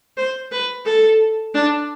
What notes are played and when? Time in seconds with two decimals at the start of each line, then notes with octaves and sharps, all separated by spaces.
0.17 C5
0.51 B4
0.85 A4
1.54 D4